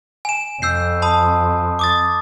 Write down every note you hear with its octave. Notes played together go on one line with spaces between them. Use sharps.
G#5 E7
F2 E6 G6 C7
A5 B5 D#6
D6 D#6 A6